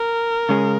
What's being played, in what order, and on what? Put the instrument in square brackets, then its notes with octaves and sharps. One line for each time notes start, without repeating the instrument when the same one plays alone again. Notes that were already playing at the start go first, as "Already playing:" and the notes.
Already playing: [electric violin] A#4
[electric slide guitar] C#3 G#3 C#4 G#4